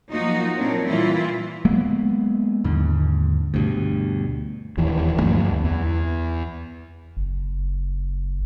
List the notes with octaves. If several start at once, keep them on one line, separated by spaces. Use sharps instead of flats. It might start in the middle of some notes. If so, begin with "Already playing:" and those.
F3 F#3 A#3 D#4 F4 F#4
A#2 C4 D4 A#4 C#5
A#2 E3 G3 E4 F4
F#3 G#3 A#3 B3
D#2 G#2 D3
D2 G2 B2
D#1 E2 D#3 E3
D2 G2 F3 A#3
E2
F#1